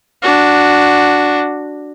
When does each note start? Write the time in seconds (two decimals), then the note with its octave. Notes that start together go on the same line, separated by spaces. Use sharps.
0.23 D4 F#4